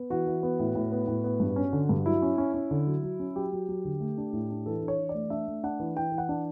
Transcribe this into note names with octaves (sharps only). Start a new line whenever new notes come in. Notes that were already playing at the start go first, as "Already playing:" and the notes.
Already playing: B3
E3 F#4
E3
B3
A2
A2
B3
A2
B3
G2
C#4
D3
G2
F#3 E4
C#4
C#4
C#4
D3
F#3
F#3
C#4
F#3 G4
F#3
F#3
D3
A3
D4
A2
D4
E3 A4
D4
C#5
E3
D5
A3
D4 E5
A3
D4 F#5
E3
E3 G5
E3
F#5
D4